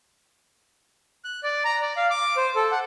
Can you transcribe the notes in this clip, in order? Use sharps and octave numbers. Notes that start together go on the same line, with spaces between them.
F#6
D5
A#5
D5
F5
D6
C5
A4
F#5